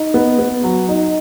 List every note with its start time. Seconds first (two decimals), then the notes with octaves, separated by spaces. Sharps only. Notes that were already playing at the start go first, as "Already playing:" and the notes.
Already playing: D#4
0.14 B3
0.39 B3
0.63 F#3
0.89 D#4